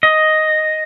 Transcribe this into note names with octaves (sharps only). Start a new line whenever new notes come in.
D#5